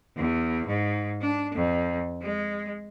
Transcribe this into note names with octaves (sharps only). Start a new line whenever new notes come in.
E2
G#2
D4
F2
G#3